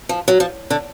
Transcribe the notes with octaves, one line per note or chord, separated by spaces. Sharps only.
F3
F#3
F3
D3